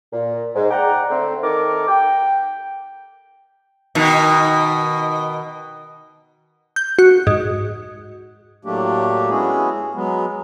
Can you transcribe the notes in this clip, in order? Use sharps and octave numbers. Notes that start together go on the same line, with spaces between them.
A#2
G#2
D5 F#5 G5 A#5
D3 A3 C4
D#3 A4 A#4 D6
G5
B2 D#3
G6
F#4
G#2
A2 F#3 A3 A#3 D4 G4
G#3 B3 C#4 E4 F#4 G#4
F#3 G#3 B3